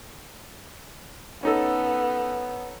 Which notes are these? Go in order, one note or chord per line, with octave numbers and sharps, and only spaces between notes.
B3 C#4 D#4 A4